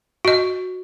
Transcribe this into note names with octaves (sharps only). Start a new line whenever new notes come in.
F#4 D#5